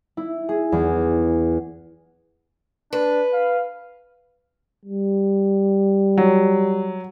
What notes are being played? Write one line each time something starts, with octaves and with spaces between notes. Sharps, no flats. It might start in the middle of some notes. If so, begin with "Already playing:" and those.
E4
G#4
E2
D4 B4
F5
G3
F#3